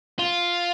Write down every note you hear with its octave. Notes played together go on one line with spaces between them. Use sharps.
F4